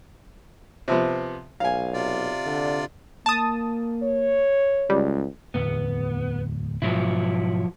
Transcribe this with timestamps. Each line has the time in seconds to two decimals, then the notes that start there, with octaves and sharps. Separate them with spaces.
0.88 C3 F3 B3
1.60 B1 F5 G#5
1.94 C3 F4 D5
2.46 D3
3.26 A#3 A5 D#6
4.03 C#5
4.90 C#2 G3
5.54 D1 E2 B3
6.82 G#2 B2 F3 F#3 E4